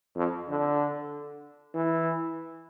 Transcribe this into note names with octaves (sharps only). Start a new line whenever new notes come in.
F2
D3
E3